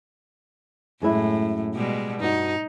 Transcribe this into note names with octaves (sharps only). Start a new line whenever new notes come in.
F#2 A2 G#3 E4
B2 G3 G#3
G2 D#4 F#4